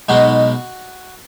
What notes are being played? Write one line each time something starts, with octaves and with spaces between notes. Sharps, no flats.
B1 B2 G#3 D#4 F#4